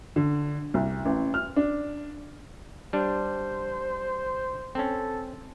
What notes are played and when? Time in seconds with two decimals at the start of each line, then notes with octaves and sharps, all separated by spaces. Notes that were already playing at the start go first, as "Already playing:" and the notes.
0.16 D3
0.74 C2
1.05 A1
1.34 F6
1.56 D4
2.93 G3 D4 C5
4.75 C4 C#4 A4